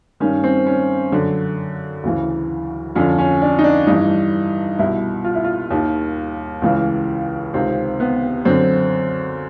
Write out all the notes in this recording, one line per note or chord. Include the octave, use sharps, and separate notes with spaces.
G2 D#3 C#4
C4
C#4
F#2 D3
D2 C#3 E3
F2 D3 C#4
C#4
D4
D#4
D4
G2 E3 D#4
C2 B2 E4
F4
E4
F4
D#2 D#3
C#2 C#3 E3
C#2 C3 D#3 C4
B3
F#2 D3 C4